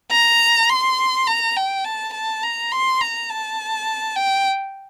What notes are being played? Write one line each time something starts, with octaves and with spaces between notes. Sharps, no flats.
A#5
C6
A#5
G5
A5
A5
A#5
C6
A#5
A5
G5